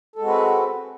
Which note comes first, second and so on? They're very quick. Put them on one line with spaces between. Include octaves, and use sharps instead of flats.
A4 G#3 F#4 C4 B4